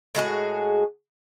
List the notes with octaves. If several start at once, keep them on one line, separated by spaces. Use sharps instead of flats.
A2 G#3 F#4 G#4